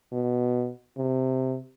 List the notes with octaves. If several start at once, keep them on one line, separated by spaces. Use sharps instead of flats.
B2
C3